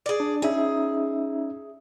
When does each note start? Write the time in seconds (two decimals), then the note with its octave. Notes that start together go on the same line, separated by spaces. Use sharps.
0.06 G#4 D5
0.20 D4
0.42 C#4 D#4 G#4 E5